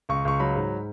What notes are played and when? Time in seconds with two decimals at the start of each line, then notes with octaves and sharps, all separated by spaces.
0.09 C#2 C#6
0.25 C#2 C#6
0.40 F#3 B5
0.56 G#2